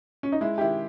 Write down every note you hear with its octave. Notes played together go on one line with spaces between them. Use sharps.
C#4
D#4
G#3 E4
G4
D#3 E4